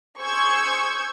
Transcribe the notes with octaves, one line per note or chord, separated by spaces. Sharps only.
G#4 C5 C#6 E6 G6 G#6